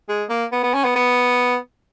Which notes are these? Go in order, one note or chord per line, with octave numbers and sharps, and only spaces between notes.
G#3
A#3
B3
B3
C#4
B3
B3